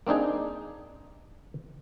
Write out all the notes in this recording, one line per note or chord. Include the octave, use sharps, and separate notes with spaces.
A#3 C4 D4 D#4 G#4